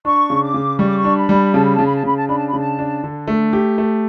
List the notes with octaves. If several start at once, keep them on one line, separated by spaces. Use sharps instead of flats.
D4 C#6
C#3
D6
C#3
G3 C#6
D6
C#6
D4
B5
G3
C#3 A5
B5
C#3 A5
B5
A5
C#3 B5
A5
D4 B5
A5
B5
C#3 A5
D4
D3
A3
G4
A3